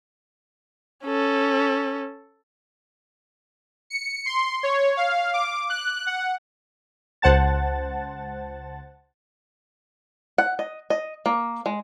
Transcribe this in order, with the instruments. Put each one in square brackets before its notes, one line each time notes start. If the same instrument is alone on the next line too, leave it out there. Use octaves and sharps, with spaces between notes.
[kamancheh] C#4 A4
[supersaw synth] C#7
C6
C#5
F5
D6
F#6
F#5
[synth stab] C#2 C5 F#5 A5 A6
[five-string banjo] F#5
D#5
D#5
A#3
G#3